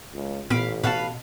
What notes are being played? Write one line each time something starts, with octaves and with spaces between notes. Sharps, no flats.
C#2
A1 A#2 B3 F5 B5 D7
B2 B4 F5 F#5 A5